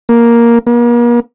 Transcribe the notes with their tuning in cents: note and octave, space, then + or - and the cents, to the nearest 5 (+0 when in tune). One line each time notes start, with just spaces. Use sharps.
A#3 +5
A#3 +40